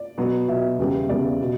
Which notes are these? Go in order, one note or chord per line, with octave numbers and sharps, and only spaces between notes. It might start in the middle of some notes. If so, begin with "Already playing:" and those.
Already playing: D5
B2 F#3 B3
B2 F#3 B3 E5
E2 C#3 G3 B3
E2 C#3 G3 B3 D5
B2